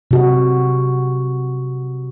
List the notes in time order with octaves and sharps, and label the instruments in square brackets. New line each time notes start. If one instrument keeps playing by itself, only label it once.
[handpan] C3 F#4 G4